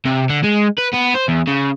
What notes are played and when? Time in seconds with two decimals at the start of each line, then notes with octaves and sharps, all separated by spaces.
0.06 C3
0.30 D3
0.44 G#3
0.78 B4
0.93 B3
1.14 C5
1.28 E2
1.47 C#3